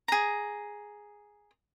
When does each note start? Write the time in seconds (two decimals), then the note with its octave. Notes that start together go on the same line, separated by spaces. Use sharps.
0.08 G#4 A#5